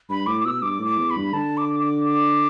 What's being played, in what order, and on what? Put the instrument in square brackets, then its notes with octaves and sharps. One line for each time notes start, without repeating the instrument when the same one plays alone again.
[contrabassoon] G2 [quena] B5
[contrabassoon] A2 [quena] D6
[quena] D6
[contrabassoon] B2 [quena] E6
[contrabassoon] G2 [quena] D6
[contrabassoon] A2
[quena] D6
[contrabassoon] E2
[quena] B5
[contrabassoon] G2
[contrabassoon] D3 [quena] A5
[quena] D6
D6
D6